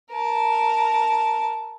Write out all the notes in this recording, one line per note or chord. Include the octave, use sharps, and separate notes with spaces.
A#4 A5